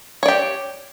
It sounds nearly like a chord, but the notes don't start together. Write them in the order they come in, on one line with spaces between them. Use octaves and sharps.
C#5 D5 G4